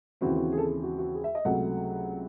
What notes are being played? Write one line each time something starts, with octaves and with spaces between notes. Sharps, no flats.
D#2 C#3 E3 C4 F#4
F#4
G#4
A4
G#4
F#4
F#4
G#4
E5
D#5
C#2 C3 F#3 A3 F#5